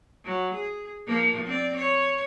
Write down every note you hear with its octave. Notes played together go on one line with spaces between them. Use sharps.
F#3
G#4
F3 A#3
C4 D5
C#5